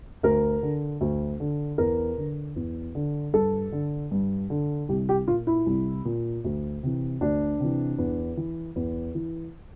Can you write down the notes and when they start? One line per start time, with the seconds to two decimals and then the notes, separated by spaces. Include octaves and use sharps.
0.23 D2 A#4
0.63 D3
1.01 D2
1.40 D3
1.78 E2 A#4
2.18 D3
2.56 E2
2.95 D3
3.33 G2 A4
3.72 D3
4.11 G2
4.50 D3
4.89 C2 G4
5.09 G4
5.28 A#2 F4
5.47 E4
5.66 C2
6.05 A#2
6.44 D2
6.83 C3 E3
7.21 D2 D4
7.60 C3 E3
7.98 E2
8.37 E3
8.76 E2
9.15 E3